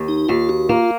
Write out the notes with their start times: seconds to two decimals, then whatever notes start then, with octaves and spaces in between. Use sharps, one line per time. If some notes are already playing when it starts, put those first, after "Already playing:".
Already playing: D#2
0.08 D#4
0.29 D#2 F4
0.49 F#4
0.69 A#3 F4